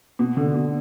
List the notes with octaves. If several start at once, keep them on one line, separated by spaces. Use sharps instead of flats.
B2
D3
B2